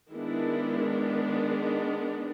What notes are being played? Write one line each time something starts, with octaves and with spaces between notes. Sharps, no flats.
D#3 G#3 B3 D4 E4